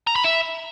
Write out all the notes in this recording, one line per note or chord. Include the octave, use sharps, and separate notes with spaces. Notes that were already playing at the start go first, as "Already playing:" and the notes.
A#5
B5
E5